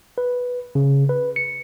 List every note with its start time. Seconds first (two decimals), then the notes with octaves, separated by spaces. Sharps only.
0.18 B4
0.75 C#3
1.09 B4
1.36 C#7